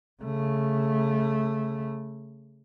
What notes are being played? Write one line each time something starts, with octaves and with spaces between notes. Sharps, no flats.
C#3 A3